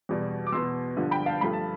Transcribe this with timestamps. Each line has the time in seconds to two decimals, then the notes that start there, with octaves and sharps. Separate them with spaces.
0.09 E2 B2 G3
0.47 D6
0.52 E2 B2 B3 C6 E6
0.97 G2 D3 F3
1.11 G5 B5
1.26 F5 A5
1.41 G2 F3 A3 B5
1.53 A5